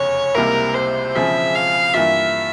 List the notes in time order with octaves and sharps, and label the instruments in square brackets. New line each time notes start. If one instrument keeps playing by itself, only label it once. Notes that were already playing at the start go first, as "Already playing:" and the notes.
Already playing: [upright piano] F1 E2 C#3 [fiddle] C#5
[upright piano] C#2 C3 G3 A#3 E4 [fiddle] A#4
[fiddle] C5
[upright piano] E1 E2 C#3 F3 C4 [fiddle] E5
[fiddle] F5
[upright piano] G2 E3 A#3 F4 [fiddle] E5